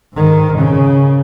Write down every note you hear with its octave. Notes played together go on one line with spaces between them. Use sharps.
G#2 D#3
C#3